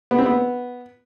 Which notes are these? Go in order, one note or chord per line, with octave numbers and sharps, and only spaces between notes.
B3
C4
B3